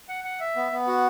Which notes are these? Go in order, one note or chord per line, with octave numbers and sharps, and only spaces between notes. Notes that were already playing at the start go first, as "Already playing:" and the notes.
F#5
F#5
E5
B3
B3
F#4